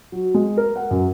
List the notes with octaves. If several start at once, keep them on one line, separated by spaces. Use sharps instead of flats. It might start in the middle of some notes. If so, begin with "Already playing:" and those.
F#3
G#3
A#4
F#5
F#2